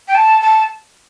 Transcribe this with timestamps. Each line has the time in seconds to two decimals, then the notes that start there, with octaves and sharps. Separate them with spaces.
0.08 G5
0.15 A5
0.42 A5